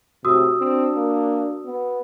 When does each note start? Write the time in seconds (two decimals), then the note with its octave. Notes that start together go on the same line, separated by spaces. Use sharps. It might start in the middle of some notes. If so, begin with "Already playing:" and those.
0.25 A2 C3 F#4 D#6 E6
0.60 C4 D4
0.96 A#3
1.66 B3